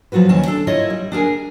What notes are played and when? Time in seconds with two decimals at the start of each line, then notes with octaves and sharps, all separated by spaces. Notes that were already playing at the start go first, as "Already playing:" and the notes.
0.12 F3 F#3 F4 F#4 B4
0.29 D#2 D#3 E3 C#4 A5
0.46 D4 A4
0.67 E4 F4 A#4 C#5 D#5 E5
0.90 G3
1.12 D4 G#4 A#4 G#5